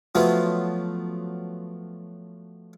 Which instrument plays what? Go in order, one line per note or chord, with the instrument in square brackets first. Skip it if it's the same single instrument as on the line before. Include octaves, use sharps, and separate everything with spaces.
[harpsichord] F3 F#3 A3 B3 F4 E5